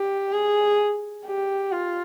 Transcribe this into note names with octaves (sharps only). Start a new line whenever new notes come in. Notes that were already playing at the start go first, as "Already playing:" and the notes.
Already playing: G4
G#4
G4
F4